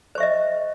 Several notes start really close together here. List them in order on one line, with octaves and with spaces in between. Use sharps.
C5 C#6 E5 D#5